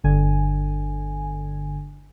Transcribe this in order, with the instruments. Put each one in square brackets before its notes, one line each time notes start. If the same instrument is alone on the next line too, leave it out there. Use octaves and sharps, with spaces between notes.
[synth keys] G1 D3 G#5